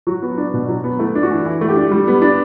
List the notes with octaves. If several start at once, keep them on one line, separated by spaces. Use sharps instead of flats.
F#3 F#4
B3
D4
B2
F#3
B3
A3 E4
D4
F#4
E3
E3 E4
A3
G4
D4
G3
B3
D4